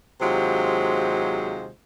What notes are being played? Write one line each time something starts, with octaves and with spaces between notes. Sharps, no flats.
D#2 C3 F#3 G#3 F4 C5